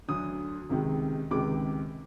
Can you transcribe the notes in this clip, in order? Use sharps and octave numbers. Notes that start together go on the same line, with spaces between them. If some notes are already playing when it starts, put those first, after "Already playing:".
D2 D3 F#3 D#6
C#2 C3 D#3 G#3
C#2 C3 D#3 G#3 D6